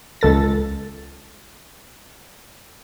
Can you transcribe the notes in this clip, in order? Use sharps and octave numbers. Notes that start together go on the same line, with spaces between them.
C#2 A4 A6